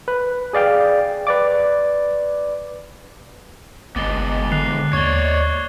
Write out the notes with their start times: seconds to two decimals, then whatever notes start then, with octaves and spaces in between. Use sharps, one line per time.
0.08 B4
0.53 G#4 D5 F5 G5
1.27 B4 D5 D6
3.96 G1 B2 G#3 B3 D6 A6 G7
4.51 D3 F#6 C7 F7
4.93 D#2 C#5 D5 C#6 G#6 G7